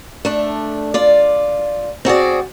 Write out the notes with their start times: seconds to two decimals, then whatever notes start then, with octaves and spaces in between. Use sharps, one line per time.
0.25 A3 D4
0.94 F4 D5
2.05 C4 F#4 G#4 D5